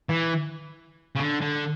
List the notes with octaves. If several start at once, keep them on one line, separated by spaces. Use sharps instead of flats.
E3
C#3
D3
D3